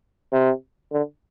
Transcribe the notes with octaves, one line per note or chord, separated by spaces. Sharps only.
C3
D3